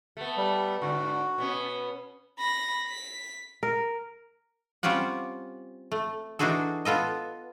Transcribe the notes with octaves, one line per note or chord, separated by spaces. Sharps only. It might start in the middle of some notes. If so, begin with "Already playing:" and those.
A3 B3
G3
G#2 D3 F#4
B2 B3 C#4
B5 A#6
B6
A#4
G3 C4 C#4 F4 G4 F#5
A3
E3 D4 D#4 F#4 G#4 A4
B3 F4 A4 D#5